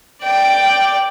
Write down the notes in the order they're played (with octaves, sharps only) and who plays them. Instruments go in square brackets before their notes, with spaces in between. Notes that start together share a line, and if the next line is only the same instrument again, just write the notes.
[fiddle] D5 G5